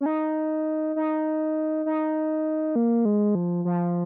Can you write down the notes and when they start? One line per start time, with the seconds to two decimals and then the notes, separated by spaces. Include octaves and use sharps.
0.01 C#4
0.06 D#4
0.96 D#4
1.86 D#4
2.76 A#3
3.05 G#3
3.35 F3
3.65 F3